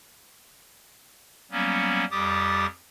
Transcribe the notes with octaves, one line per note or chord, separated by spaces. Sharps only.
F#3 G3 A#3 B3 C#4
F2 G3 G4 D6 D#6 A6